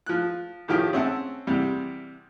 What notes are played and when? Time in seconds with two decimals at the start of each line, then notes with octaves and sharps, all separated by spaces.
0.06 F3 F#6
0.68 A2 D#3 F3 G4
0.93 C4 C#4 E5 F#5 A5
1.47 E2 C3 G3